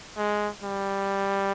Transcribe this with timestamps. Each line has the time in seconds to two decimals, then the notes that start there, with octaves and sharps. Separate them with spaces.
0.17 G#3
0.63 G3